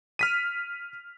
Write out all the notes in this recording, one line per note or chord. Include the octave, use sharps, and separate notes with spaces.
F6 B6 D#7